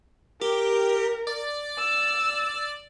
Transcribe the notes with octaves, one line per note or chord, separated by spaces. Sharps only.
G4 A#4
D5
E6